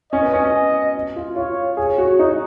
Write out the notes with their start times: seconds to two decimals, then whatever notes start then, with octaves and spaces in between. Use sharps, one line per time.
0.12 C#4 D#5
0.22 B3
0.33 C#4
0.44 C#4
1.16 F4
1.36 F4 C#5
1.77 G#4 C#5
1.98 F#4
2.19 D#4